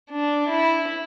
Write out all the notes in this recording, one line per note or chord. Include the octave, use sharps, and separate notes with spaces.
D4
E4